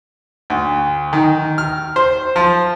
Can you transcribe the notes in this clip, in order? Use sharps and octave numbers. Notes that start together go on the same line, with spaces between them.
D2
D#3
F6
C5
F3